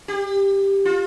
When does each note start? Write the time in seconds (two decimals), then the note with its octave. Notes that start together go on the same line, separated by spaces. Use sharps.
0.08 G4
0.85 F4